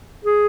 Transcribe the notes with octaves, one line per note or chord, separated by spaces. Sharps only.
G#4